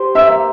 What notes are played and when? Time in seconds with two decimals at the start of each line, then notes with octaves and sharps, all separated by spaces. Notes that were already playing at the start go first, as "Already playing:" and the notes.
Already playing: G4 C5
0.15 E5 E6
0.27 A#3